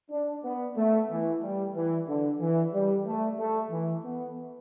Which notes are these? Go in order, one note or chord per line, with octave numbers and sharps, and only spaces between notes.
D4
B3
A3
E3
G3
E3
D3
E3
G3
A3
A3
E3
B3